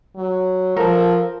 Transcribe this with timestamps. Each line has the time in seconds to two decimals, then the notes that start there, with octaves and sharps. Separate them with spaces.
0.16 F#3
0.76 F3 A4 A#4